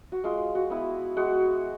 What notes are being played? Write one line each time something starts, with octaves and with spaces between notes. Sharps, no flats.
F#4
G#3 F4
F#4
B3 E4
G#3 F#4